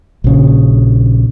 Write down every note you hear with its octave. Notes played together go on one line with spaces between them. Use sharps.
A#1 C#3